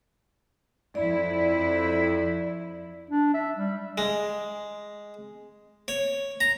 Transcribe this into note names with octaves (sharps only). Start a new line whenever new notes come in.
F2 E4 D5
D4
E5
G3
G#3
C#5
A#5